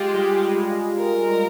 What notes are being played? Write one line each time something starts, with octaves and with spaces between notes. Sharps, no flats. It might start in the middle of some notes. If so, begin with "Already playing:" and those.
Already playing: G#3 F4 G4
G3
G#3
A#4